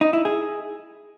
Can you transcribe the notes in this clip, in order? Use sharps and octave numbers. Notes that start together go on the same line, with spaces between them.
D#4
E4
G#4